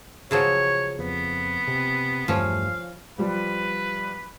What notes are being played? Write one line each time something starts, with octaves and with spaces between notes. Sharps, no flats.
C#3 F3 F#3 C#5
F2 B3
C3
E2 G2 F3 A3 C#4 F5
F3 G3 B4